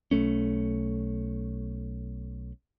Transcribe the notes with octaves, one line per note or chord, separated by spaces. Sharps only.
B1 A3 C#4